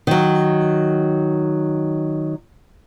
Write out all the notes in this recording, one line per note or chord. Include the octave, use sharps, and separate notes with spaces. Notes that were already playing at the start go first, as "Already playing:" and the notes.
D#3 F#3